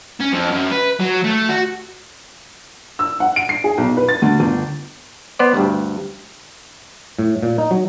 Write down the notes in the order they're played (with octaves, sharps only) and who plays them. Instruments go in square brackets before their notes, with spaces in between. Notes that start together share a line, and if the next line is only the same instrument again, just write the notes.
[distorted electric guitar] C#4
F2
F#2
B4
F#3
A3
F#4
[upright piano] E6
F#5
D7
C7
G#4
B1
B4
A6
D2
G1
[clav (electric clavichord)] B3 C5 D5
D2 G2
A2
A#2
D#4
F#3